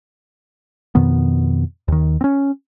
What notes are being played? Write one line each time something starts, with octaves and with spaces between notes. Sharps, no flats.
F2 B2 D#3 B3
D#2 D#3
C4 C#4